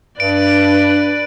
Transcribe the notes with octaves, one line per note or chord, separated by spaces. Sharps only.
G2 D4 B4 D5 D7